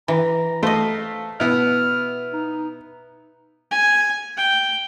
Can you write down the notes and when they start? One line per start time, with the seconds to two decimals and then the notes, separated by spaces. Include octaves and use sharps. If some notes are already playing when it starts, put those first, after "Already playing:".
0.08 E3 A#5
0.63 A3 C5 D#5 F5
1.40 B2 B3 E4 F6
2.33 D#4
3.71 G#5
4.37 G5